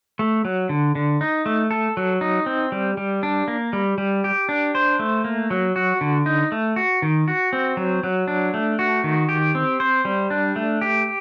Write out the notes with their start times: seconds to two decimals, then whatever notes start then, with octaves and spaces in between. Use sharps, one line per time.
0.19 A3
0.45 F#3
0.69 D3
0.95 D3
1.21 D#4
1.46 A3
1.71 A4
1.97 F#3
2.21 D#4
2.46 C4
2.72 G3
2.97 G3
3.23 D4
3.48 A#3
3.73 G3
3.98 G3
4.24 G4
4.49 D4
4.75 C5
4.99 A3
5.24 A#3
5.50 F#3
5.76 F#4
6.01 D3
6.26 D#4
6.52 A3
6.76 F#4
7.02 D#3
7.28 F#4
7.53 C4
7.77 F#3
8.03 F#3
8.28 D4
8.54 A3
8.79 F#4
9.04 D#3
9.29 G4
9.55 C4
9.80 C5
10.05 G3
10.30 D4
10.56 A3
10.81 G4